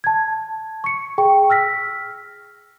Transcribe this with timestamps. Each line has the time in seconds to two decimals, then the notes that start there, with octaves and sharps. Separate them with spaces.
0.04 A5 G#6
0.84 C#6 C#7
1.18 G#4 G5 C#6
1.50 E6 F6 A#6 B6